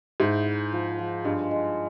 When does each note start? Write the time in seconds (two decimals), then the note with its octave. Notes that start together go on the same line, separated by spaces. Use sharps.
0.20 G#2 E4
0.46 E5
0.73 F3
0.99 F3
1.24 G2 G#3
1.51 G#3